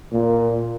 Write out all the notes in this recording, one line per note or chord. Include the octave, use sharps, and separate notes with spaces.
A#2